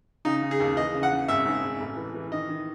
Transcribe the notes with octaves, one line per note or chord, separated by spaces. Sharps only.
C#3 D#4
C#3
G#4
D#2
E3 D#5
C#3
F#5
C#3
G#1 E5
G#2
G#2
A1
E3
E3
D#3 D#5
D#3